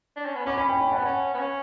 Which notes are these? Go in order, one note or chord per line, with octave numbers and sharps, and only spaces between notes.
D4
C#4
B3
C#4 B5 D6
C#4 B5 D6
C#4 G5 B5
G5 B5
F#5 A5
B3
C#4
B3
C#4